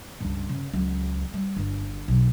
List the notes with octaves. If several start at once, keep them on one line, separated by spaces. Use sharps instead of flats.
C#2 G2
C#3
C#2 F#3
G3
G1
B1